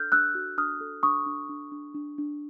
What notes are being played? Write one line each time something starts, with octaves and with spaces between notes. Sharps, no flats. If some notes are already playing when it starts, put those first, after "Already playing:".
Already playing: D4 A4 F6 G6
D4 E6 F#6
F#4
D4 D#6 F6
A4
D4 C#6 D#6
D4
D4
D4
D4
D4